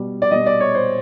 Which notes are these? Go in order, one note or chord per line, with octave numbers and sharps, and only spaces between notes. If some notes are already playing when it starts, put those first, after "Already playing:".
Already playing: B2 G3
D5
B2 G3 D#5
D5
C#5
C5